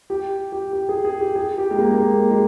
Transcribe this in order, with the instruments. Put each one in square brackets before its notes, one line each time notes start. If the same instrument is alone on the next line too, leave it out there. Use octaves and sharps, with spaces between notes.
[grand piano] G4
G4
G4
G#4
G#4
G4
G#4
G4
G#3
A#3
A#3
G#3
G#3